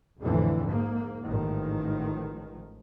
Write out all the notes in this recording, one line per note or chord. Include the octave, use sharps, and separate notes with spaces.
A#1 F2 A2 D3 E3
G#2 A#3
A1 G#2 D#3 F3